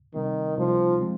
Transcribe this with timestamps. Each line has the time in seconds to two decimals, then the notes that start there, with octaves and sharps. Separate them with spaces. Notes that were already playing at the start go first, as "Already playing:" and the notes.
0.14 C3 D#3 G3 C4 D#4
0.57 C3 F3 G3 C4 D#4
1.01 F3 G#3 C4